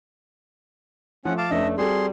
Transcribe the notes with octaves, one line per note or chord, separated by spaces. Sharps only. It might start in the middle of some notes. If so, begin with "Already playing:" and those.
F3 A3 C#4 F#5
F5 A5 D6
F1 A3 C#4 D4 D#5 E5
G3 C4 F#4 G#4 A4 C6